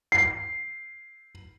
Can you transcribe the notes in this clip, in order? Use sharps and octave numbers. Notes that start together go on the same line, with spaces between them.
C7